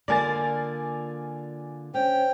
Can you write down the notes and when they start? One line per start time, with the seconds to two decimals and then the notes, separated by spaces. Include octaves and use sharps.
0.08 D3 A#3 F4 D5 G#5 A6
1.95 C#4 C5 G5